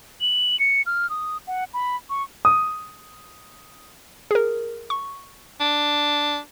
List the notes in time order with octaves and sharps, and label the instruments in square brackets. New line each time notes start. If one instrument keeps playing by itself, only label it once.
[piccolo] F#7
C#7
F6
D#6
F#5
B5
C#6
[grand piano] D#6
[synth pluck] G#4 A#4
C#6
[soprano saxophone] D4